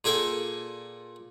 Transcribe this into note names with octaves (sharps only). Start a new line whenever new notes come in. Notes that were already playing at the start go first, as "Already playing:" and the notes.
A#2 G#4 A4 G5 G#5